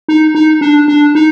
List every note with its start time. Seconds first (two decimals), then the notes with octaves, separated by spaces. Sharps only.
0.08 D#4
0.35 D#4
0.61 D4
0.88 D4
1.15 D#4